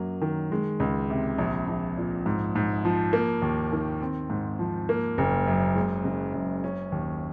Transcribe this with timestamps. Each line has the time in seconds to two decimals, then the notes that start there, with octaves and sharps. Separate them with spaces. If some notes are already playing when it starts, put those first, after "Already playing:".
Already playing: F#2 F#3 A#3
0.22 D#3
0.52 G#3
0.80 C#2
1.10 C3
1.38 A#1
1.68 A#1
1.97 A#2
2.26 G#2
2.56 G#2
2.85 F3
3.13 A#3
3.42 D#2
3.72 D#3
4.02 C4
4.30 G#2
4.59 F3
4.89 A#3
5.18 F#1
5.47 F#2
5.75 G#3
6.04 F#1
6.34 F#2
6.64 C#4
6.92 D#2